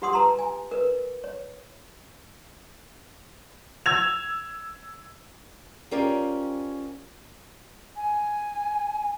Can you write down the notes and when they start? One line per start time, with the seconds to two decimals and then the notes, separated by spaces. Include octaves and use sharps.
0.02 F4 G4 F#5 C6 D#6 E6
0.13 B4 A5 A#5 C6
0.39 G#5
0.71 A#4 B4
1.24 C#5
3.86 E6 G#6 F7
5.91 C#4 F4 G4 A#4 C5 D5
7.96 G#5